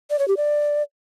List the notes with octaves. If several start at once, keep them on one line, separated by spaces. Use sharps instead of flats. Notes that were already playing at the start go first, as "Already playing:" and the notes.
D5
C#5
G4
D5